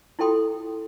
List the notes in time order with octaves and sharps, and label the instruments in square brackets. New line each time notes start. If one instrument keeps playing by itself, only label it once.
[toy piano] E4 F4 A4 G5 C6 D#6